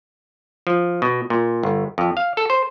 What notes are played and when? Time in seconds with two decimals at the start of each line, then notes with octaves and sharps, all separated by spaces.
0.67 F3
1.02 B2
1.30 A#2
1.63 G1
1.98 F2
2.17 F5
2.37 A4
2.50 C5